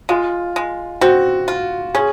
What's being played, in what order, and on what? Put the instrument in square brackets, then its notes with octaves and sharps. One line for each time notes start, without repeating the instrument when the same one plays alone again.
[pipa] G#3 [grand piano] F4
[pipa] G#3
[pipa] C4 [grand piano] F#4
[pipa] F4
[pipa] C#4 [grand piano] G#4